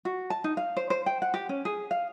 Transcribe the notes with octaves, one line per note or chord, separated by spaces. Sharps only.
F#4
A5
D#4
F5
C5
C5
G5
F#5
G4
C#4
G#4
F5